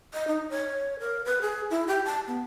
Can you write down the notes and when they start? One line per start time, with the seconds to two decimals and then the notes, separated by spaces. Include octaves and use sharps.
0.13 D#5
0.28 D#4
0.50 C#5
1.00 A#4
1.25 B4
1.42 G#4
1.71 E4
1.87 G4
2.05 A5
2.27 B3